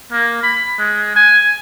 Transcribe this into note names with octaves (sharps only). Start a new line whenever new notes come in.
A#3
B5
G#3
G#5